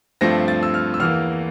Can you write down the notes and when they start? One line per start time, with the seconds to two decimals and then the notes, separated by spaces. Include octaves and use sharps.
0.21 G2 F3 A3 C4 A#6
0.48 A6
0.63 E6
0.74 F6
0.94 E6
1.00 E2 E3 A#3 F6